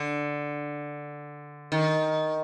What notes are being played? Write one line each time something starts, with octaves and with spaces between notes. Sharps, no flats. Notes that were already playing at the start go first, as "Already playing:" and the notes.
Already playing: D3
D#3